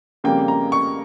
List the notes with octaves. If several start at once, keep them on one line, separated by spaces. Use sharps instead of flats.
F2 C#3 G3 A#3 G5
A#5
C#6